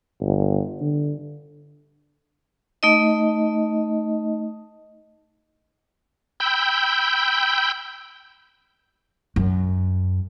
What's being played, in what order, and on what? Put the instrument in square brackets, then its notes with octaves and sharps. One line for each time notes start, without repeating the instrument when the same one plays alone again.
[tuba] G1
D3
[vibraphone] A3 D#4 D#5
[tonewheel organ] G5 B5 E6 G6
[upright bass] F#2